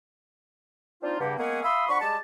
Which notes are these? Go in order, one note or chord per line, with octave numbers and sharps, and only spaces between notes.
C4 D4 D#4 F4
E2 G2 C#3 A#3 G4 F#5
G#3 A#3 B3 C#4 G#4 F#5
E5 F5 B5 C6 D#6 E6
F3 D4 F#5 B5 C#6
G3 G#3 G4 A5